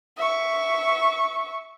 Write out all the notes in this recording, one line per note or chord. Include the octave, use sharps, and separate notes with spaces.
E5 C#6